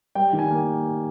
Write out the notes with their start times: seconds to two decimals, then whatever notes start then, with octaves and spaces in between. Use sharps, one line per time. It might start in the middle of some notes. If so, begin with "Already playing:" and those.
0.15 G3 G5
0.33 D#3
0.39 G#5
0.51 A#3